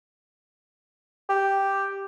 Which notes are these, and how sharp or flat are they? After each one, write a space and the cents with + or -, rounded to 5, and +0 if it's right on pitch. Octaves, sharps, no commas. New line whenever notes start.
G4 +0